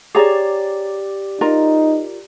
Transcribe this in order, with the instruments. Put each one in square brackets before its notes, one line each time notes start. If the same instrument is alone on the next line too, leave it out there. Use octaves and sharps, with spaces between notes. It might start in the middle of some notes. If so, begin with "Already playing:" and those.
[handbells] G4 D5 [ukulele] G#4 C#5 A#5
[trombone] D#4 [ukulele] F4 A#4 A#5